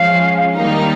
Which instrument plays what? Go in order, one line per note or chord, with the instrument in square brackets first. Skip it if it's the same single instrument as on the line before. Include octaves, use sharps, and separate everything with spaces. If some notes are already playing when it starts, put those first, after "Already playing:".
Already playing: [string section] F3 G#3 C#4 [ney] F5
[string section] D#3 G3 A#3 D#4